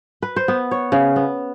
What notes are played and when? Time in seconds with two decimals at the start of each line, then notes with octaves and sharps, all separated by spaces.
0.23 B4
0.36 C5
0.48 B3
0.71 C#5
0.92 C#3
1.16 B3